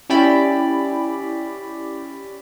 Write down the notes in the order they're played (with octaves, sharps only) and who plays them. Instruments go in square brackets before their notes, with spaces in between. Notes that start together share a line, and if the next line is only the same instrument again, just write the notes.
[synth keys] C#4 E4 G4 D5 B5